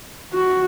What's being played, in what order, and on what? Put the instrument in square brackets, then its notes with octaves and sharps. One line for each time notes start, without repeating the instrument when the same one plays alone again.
[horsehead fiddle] F#4